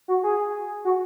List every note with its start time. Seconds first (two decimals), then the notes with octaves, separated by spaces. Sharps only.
0.08 F#4
0.23 G#4
0.85 F#4